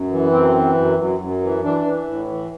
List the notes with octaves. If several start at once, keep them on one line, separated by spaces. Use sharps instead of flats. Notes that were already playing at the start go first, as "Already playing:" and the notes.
Already playing: F#2
E3
F#2 C4
E3
F#2
F#2
F#2
E3
E3 D4
E3
A2
E3